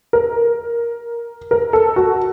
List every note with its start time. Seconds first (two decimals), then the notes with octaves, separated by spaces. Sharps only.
0.13 A#4
1.51 A#4
1.73 A4
1.96 F#4